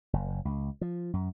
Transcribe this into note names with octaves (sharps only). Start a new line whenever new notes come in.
F#1
C#2
F3
F#2